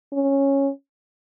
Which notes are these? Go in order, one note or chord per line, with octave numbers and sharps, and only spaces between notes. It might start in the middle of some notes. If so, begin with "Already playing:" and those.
C#4